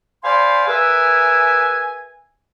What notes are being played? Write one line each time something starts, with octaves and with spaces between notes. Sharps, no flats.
C5 D5 F5 G#5 B5 C6
G#4 A#4 B4 E5 G#5